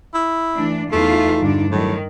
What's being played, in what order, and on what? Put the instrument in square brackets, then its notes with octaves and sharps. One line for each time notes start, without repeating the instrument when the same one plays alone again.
[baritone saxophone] E4
[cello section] E3 D4 [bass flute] A3
[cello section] E2 E3 F4 [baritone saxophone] A3 [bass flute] D#4
[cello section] G2 D3 D4
[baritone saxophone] A2 [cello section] D#3 [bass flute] F#3